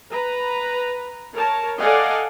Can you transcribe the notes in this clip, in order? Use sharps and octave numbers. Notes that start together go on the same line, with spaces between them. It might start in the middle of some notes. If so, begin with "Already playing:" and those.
B4 A#5
A#4 C#5 A5
A4 D5 D#5 F5 F#5 G#5